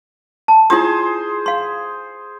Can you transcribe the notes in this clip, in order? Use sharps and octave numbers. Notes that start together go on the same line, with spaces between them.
A5
E4 F4 G#4 C5 D#6
F5 C6